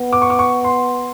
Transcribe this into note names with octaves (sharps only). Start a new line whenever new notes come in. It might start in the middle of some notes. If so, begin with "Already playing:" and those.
Already playing: B3
D6
C#6
D6
C#6
C6